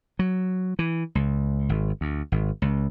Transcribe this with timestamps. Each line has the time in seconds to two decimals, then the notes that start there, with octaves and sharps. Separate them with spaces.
0.19 F#3
0.79 E3
1.15 C#2
1.69 G#1
2.01 D2
2.32 G#1
2.62 C#2